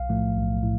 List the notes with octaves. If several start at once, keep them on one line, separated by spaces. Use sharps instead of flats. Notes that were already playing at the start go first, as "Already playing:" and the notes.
Already playing: B1 F5
A2 F3 A3
B1
A2